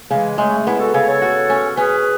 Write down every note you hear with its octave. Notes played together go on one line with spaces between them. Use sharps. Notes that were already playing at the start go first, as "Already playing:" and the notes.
C#3 E3 G#3
F#3 G#3 A3
B3 C#4 E4
F#4 A4
C#3 A4 C#5
A4 C#5
F#4
C#4
C#4 G#4 B4